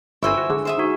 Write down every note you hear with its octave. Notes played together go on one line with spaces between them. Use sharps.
G1 C4 E4 C5 G#5 C#6 E6
F#4 G5
D3 G#4
C5 E5 D#6
D#4 F#4